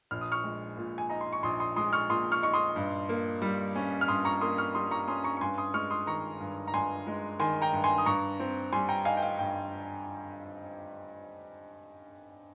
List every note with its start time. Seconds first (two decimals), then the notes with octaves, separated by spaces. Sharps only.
0.11 A#1 F6
0.21 D#6
0.32 C#6 F6
0.44 G#3
0.77 A#2
0.98 G#5
1.10 D#4 A#5
1.21 C6
1.33 C#6
1.43 A#1 C6 D#6
1.60 C6 D#6
1.76 G#3 C6 D#6
1.93 C#6 F6
2.10 A#2 C6 D#6
2.32 C#6 F6
2.42 D#4 C#6
2.54 C6 D#6
2.76 G2
3.09 A#3
3.42 G3
3.75 C#4
4.01 F6
4.08 G2 C6 D#6
4.25 A#5 C#6
4.41 A#3 C6 D#6
4.58 C#6 F6
4.75 G3 C6 D#6
4.91 A#5 C#6
5.08 C#4 C6 D#6
5.24 A#5 C#6
5.37 C#6
5.41 G2 G#5 C6
5.58 C6 D#6
5.74 G#3 C#6 F6
5.91 C6 D#6
6.07 D#3 A#5 C#6
6.40 G2
6.67 A#5
6.74 G2 G#5 C6
7.07 G#3
7.39 D#3 G#5 C6
7.62 G5 A#5
7.73 G2
7.84 G#5 C6
7.98 D#6
8.06 G2 A#5 C#6
8.40 C4
8.72 G3 G#5 C6
8.89 G5 A#5
9.05 D#4 F5 G#5
9.17 G5
9.22 F5
9.39 G2 G5